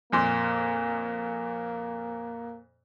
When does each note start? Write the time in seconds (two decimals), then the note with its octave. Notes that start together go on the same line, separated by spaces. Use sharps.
0.12 F2 A#2 A#3 C6